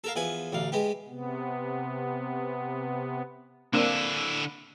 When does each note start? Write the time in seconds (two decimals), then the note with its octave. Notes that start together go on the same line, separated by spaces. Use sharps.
0.04 A4 A#4 F5
0.16 E2 F3 B4 G#5
0.53 A1 D2 F5
0.72 G#3 B3 G4
1.07 C3 B3
3.73 D3 A#3 C4 D4 E4